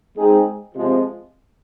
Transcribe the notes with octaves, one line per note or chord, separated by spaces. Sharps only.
G#3 C4 D#4 G#4
C3 F3 G#3